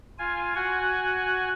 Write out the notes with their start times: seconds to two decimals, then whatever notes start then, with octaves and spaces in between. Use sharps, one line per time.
0.18 F4 G#5
0.55 F#4 F#5 G#5